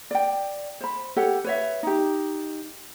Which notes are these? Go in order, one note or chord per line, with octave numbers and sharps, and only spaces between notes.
D5 G5
C5 B5
G4 A4 C#5 F#5
B4 C#5 E5
D#4 G4